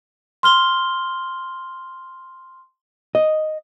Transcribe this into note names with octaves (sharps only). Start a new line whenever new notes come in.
C6 F6 G7
D#5